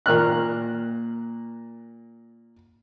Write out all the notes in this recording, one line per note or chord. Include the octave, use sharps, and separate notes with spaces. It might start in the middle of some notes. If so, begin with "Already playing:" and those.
A#2 A#3 F6 F#6